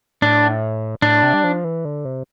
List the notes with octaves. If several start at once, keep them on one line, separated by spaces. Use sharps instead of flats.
A2 D4
A2 D4
C3
G3
F3
E3
D3
C3